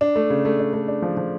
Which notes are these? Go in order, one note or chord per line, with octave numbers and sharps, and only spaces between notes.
D4
A3
C#3
A3
D4
A3
D4
F3
F3